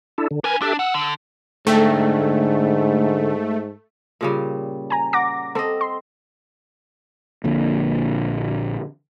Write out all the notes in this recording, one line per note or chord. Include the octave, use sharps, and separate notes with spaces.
D4 E4 A4
D3
D4 A#4 B4 G#5 G#6
D4 G4 A4 E5
F#5 E6
D3
G#2 D3 A3 A4 G5
A#2 C#3 G3
G#5 A#5
F#5 D6 A#6
C4 A4 D#5
C6
A#1 A#2 D3